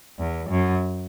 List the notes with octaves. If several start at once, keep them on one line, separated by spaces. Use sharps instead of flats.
E2
F#2